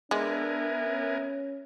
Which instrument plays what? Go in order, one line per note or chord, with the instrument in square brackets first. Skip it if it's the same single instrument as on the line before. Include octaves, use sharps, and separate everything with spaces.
[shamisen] G#3 [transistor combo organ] B3 A#4 G#5 [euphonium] D4 [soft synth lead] E5
[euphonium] C#4